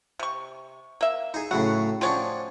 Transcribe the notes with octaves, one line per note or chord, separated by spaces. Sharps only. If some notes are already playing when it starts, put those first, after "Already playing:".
C3 C#6
A#3 E5
D#4 G#4
A2 C#3 F#3 F#5
F3 C#4 D4 C#5 F#5 G5